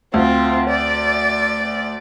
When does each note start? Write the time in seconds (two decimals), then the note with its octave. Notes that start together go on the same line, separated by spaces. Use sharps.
0.14 D2 C4 F4
0.69 D5